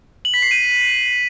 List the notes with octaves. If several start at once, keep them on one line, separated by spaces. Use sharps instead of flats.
F#7
B6
C7
D#7